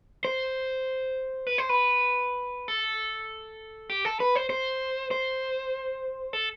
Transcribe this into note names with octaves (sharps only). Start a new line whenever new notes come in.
C5
B4
C5
B4
A4
G4
A4
B4
C5
C5
C5
A4